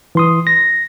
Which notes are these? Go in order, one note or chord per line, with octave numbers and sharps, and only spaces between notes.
E3 C6 D#6
A#6